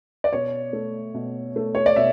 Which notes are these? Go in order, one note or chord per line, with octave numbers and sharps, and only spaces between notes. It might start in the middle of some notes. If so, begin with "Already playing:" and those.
D5
B2 C#5
A3
B2
A3
C#5
D5
B2 E5